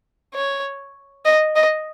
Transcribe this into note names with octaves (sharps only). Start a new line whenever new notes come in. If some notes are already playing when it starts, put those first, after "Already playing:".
C#5
D#5
D#5